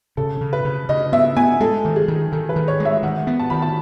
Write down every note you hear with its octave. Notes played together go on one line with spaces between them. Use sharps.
C#3 A4
C#3
B4
C#3
C#3 D#5
B3 E5
B3 G#5
G#3 A4
D#3
G#4
D#3
D#3 A4
B4
D#3
C#5
G#3
E5
D#3 F#5
B3
A5
D#3 B5
A5